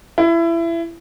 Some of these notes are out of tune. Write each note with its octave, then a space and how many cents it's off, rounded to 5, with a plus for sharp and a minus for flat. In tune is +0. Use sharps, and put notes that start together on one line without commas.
E4 +25